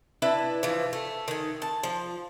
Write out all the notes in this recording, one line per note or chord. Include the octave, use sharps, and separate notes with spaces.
D4 E4 B4 A5
E3 F3
A3
D#3 G#5
A5
F3